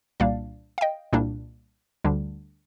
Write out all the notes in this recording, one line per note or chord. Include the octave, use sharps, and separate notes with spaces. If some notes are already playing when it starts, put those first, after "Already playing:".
C2 A#2 G3 A#3 D4 D5 F5
F5
D#5 G5
C2 A#2 G3 A#3 D4
D2 D3 G3 D4